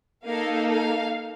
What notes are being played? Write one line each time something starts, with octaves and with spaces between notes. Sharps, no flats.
A#3 D#4 A4 F5
F5